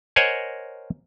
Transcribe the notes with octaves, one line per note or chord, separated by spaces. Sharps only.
A#4 C5 C#5 D#5 F#5 G#5